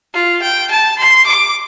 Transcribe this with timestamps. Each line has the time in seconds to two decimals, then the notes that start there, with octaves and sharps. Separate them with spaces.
0.14 F4
0.42 G5
0.71 A5
0.99 C6
1.27 D6